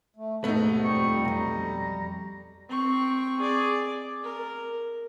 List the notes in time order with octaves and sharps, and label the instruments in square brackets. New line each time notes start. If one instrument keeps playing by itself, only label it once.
[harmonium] A3
[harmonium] D#2 G#2 [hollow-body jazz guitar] B2 B3 [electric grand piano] A3 D#4
[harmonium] F2 G3 C4 [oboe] C#6
[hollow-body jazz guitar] B1 F2 [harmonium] G3 [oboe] A#5
[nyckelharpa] C4 C#6
G#4 D5
A#4